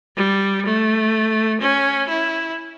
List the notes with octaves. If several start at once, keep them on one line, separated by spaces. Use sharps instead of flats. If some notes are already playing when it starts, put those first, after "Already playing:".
G3
A3
C#4
E4